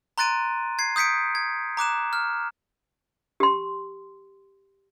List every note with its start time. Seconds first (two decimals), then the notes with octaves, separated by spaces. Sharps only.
0.18 A#5 C6 F#6 A6 D7 D#7
0.79 G#6 C7
0.96 D#6 G6 B6 C#7 D7
1.35 G#6
1.77 A#5 D6 F#6 E7
2.13 F6
3.40 G4 C6